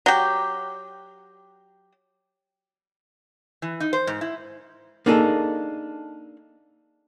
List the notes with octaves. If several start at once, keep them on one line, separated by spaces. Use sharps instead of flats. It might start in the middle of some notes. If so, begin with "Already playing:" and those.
F#3 G4
E3
D#4
C5
G#2
E4
A#3 D4 D#4 G#4 A4